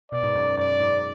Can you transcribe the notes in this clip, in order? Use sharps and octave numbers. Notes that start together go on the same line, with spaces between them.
B2 D5
G#2
F#2
G#2
F#2 D5
G#2